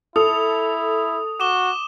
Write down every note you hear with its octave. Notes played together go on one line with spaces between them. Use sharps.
E4 A4 D#6 F7
F#4 D6 E7 G7